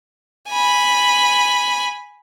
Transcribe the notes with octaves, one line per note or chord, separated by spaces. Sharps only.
G#5 B5